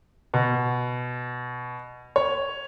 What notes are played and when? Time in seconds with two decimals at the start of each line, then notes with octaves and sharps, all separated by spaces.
0.34 B2
2.16 C#5